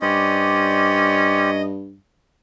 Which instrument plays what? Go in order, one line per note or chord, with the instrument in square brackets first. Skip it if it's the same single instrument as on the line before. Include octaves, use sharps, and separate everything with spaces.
[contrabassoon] G2 [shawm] C#4 [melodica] G4 C5 D5 [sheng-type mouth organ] D#5